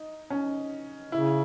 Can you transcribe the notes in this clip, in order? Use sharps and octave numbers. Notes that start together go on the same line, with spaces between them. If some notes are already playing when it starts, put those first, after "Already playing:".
Already playing: D#4
C#4
C#3 E4